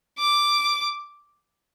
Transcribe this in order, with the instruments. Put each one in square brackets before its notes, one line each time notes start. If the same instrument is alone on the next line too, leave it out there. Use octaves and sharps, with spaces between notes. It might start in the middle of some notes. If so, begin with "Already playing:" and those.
[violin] D6